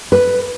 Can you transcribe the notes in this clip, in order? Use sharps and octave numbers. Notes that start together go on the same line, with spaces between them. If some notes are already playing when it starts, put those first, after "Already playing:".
B4